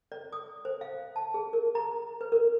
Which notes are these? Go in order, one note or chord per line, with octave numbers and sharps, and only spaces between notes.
D5
D#6
C5
F5
A5
G#4
A#4
A#5
B4
A#4